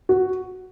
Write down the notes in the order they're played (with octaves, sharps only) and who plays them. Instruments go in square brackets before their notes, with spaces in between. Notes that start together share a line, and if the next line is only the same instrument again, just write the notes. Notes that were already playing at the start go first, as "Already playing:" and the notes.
[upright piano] F#4